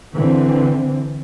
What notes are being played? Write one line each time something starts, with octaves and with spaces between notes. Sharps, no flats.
D3 E3 C4